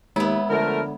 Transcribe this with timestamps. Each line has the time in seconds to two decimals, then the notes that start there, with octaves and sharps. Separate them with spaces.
0.16 D#2 G#3 B3 E4
0.50 D3 F3 A3 A#4